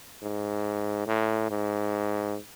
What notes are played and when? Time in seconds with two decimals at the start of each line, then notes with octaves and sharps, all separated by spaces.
0.22 G#2
1.07 A2
1.50 G#2